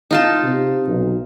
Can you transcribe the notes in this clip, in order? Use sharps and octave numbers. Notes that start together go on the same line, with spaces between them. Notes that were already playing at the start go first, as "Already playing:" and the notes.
D#4 F4 A5
C3
B1